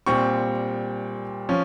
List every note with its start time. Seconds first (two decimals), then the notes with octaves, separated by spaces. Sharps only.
0.06 A#2 G3 C4 C#6
1.49 F3 C#4